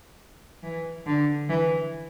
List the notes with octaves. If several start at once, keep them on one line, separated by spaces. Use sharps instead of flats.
E3
D3
E3